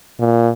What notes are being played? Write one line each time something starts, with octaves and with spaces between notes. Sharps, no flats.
A#2